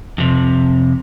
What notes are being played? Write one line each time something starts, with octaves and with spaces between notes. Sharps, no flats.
F2 C3